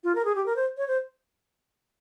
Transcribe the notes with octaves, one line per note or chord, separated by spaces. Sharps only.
F4
A#4
G#4
G4
A#4
C5
C#5
C5